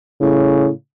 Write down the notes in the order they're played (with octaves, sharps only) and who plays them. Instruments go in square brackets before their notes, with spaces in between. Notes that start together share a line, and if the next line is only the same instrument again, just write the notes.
[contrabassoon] A2 [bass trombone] C#3